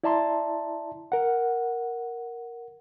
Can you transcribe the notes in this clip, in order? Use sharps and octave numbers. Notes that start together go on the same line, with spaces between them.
E4 D5 E5 A5 A#5 C6
A#4 F#5